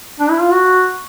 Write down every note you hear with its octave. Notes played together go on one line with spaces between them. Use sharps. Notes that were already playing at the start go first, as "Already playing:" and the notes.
D4
E4
F4
F#4